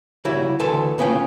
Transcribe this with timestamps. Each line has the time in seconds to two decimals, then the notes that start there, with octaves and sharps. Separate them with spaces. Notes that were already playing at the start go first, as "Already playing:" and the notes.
0.25 C#3 G3 E4 F#4
0.60 D2 E3 A4 B4 A5 C6
0.98 C#3 B3 C#4 F4 G5